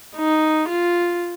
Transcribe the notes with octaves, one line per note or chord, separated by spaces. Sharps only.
D#4
F4